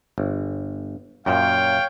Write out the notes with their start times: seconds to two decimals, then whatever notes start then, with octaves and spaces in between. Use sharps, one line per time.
0.18 G1
1.26 F#2 A#2 C#5 F5 G5